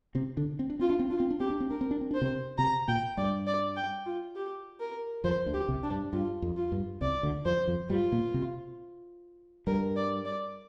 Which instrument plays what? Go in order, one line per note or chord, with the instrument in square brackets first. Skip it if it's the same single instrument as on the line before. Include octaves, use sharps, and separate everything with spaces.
[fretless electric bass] C3 C4
D3 D4
C4
D4
[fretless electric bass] C4 [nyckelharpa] F4
[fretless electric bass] D4
C4
[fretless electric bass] D4 [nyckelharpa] F4
[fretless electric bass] C4
D4
[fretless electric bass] C4 [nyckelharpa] G4
[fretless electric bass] D4
C4
[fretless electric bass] D4 [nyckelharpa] A#4
[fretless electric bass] C4
D4
C4
[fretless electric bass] D4 [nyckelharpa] C5
[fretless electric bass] C3 C4
[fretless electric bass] C3 C4 [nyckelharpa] A#5
[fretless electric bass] A#2 A#3 [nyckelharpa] G5
[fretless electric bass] G2 G3 [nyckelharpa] D5
[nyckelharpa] D5
G5
F4
G4
A#4
[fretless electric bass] F2 F3 [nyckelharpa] C5
[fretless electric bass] D2 D3
[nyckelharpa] G4
[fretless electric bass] C2 C3
[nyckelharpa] D4
[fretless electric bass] G2
[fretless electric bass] G2 [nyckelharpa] F4
[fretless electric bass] F2
[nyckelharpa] F4
[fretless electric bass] G2
[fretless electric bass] C2 C3 [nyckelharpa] D5
[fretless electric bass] D2 D3
[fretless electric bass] F2 F3 [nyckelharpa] C5
[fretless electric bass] F2 F3
[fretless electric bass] G2 G3 [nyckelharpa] F4
[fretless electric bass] A#2 A#3
C3 C4
[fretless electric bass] G2 G3 [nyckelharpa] A#4
[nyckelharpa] D5
D5